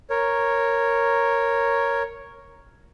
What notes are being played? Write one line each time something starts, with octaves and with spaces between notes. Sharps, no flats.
A#4 C#5